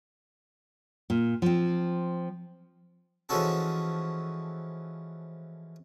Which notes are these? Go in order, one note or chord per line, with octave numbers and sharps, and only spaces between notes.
A#2
F3 C4
E3 F3 G#3 C#4 F#4 A4